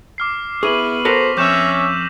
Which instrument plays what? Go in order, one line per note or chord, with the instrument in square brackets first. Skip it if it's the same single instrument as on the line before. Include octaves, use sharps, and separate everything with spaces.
[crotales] D6 F6 C7
[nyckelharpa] B3 B4 [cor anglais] E4 [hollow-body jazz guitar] G#4 [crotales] C#6 D#7 F#7
[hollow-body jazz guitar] F#4 A4 A#4 [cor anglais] C5 [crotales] A#6 B6 F7
[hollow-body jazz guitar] F2 [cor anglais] C#4 [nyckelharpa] C#5 E5 [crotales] D6 G6 E7
[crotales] E6